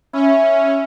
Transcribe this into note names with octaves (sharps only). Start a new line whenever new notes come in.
C#4 E4